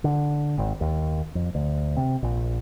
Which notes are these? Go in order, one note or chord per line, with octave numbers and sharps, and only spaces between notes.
D3
G#1
D#2
F2
D2
C3
A#1